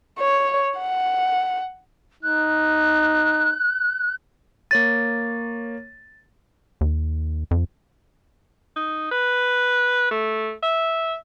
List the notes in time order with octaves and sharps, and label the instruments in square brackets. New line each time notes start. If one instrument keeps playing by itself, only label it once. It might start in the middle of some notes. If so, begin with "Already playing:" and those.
[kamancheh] C#5
F#5
[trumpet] D#4 [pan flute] F#6
[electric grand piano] A#3 C#5 D#7 [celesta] A6
[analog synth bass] D#2
F2
[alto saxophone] D#4
B4
A3
E5